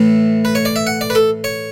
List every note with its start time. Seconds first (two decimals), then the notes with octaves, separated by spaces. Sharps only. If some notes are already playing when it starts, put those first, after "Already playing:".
Already playing: A2 E3 A3
0.45 B4
0.55 C#5
0.65 D5
0.76 E5
0.87 F#5
1.01 D5
1.10 B4
1.15 A4
1.44 C#5